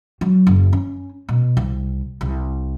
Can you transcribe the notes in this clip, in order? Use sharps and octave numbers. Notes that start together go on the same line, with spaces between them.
F#3
F#1
C#4
B2
C2
C2